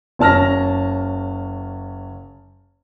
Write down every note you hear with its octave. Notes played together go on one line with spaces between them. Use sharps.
F#1 C#4 A5 F6 A#6